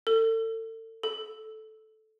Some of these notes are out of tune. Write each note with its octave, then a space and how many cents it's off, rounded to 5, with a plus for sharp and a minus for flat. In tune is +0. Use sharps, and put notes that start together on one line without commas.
A4 +35
A4 -10